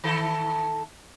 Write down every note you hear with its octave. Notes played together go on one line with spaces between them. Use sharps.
D#3 E4 A4